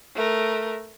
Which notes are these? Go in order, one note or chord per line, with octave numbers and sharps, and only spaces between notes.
A3 A#4